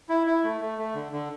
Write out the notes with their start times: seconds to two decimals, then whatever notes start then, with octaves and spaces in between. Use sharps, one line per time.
0.09 E4
0.27 E4
0.44 A3
0.61 A3
0.78 A3
0.94 D3
1.12 D3